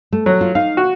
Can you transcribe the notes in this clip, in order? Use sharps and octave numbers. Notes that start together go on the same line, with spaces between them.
A3
F#3 A#4
F4
D#4 F5
F#4